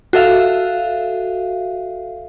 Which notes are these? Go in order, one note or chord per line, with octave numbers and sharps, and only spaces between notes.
F#4 A4 E5 F5